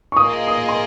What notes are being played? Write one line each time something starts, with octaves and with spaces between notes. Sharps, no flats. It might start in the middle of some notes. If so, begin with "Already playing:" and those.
C#6
A#3 F4 G#4 D#5 D#6
D#6
C6